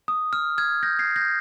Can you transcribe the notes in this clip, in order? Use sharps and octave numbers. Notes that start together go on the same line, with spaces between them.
D#6
F6
F6 G#6
G6 A#6
G#6 C7
G6 A#6